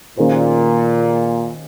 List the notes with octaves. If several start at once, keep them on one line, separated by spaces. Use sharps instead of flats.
A#2 D#3 A#3 C#4 G#4 C5